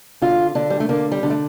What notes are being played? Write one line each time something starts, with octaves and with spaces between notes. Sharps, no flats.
D3 F4
D3 D4
G3
A3
D3 A#3
G3
D3
A3